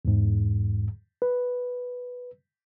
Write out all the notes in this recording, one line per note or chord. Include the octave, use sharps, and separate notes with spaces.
E2 G#2
B4